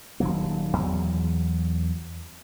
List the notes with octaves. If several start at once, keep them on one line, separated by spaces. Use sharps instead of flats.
D#1 D#3 F#3 A#3
E2 E3 F#3